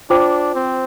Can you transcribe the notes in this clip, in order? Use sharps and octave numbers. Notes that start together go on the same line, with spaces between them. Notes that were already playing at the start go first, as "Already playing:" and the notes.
D4 F4 C5 G5 D6
C4